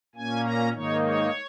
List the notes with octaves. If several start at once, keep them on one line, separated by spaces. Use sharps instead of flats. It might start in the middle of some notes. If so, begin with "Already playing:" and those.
A#2 A#3 C#4 G#5
A#5
G#2 D#3 A#3 D#4 C#5
C#5